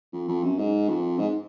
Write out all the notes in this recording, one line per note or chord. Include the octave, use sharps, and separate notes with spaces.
F2
F2
F#2
G#2
F2
G#2